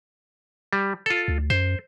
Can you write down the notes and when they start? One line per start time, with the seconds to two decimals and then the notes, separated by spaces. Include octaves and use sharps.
0.73 G3
1.06 F4 A4
1.28 D2
1.50 F#2 C5